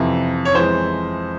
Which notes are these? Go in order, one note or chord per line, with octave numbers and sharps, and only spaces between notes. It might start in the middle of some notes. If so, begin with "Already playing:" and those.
Already playing: F2 C3 E3
C#5
F2 E3 G#3 C5